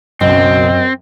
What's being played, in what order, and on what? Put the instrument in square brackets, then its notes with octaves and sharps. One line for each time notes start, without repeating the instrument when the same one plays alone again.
[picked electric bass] F#1 B1 [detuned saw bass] F#2 [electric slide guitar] C4 [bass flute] D#5